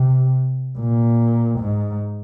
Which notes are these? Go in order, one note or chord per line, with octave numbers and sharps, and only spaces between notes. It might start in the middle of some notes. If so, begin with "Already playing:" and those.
Already playing: C3
A#2
G#2